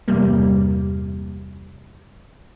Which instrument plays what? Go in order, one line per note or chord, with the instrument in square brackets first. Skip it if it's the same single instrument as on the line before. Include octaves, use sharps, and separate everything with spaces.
[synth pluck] E2 G2 C3 G3 A#3